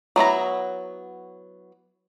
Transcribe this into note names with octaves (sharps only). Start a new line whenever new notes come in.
F#3 B3 E4 A#5